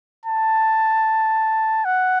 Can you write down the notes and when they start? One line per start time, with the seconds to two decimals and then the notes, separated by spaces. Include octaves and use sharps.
0.26 A5
1.84 F#5